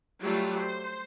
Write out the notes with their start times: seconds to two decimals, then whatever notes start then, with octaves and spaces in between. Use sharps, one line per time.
0.22 F#3 G3 A3 F4
0.58 C5